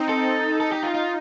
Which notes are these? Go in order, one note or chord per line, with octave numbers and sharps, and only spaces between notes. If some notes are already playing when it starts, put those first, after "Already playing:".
Already playing: C4 D#4
A4
D#4 A4
G4
F4
F4